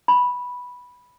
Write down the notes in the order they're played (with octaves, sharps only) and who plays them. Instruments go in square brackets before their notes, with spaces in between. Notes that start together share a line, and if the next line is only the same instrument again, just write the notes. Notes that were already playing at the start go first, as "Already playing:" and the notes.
[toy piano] B5